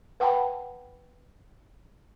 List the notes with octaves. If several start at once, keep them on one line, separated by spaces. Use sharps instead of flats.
B4 F#5 G5 A5 B5